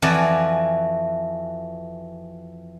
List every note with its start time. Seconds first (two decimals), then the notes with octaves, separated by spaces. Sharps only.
0.02 F2 E3 F#4 D5 G#5